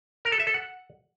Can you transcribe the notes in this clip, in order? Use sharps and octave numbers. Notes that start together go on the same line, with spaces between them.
A#4
A4
E5
A4
F#5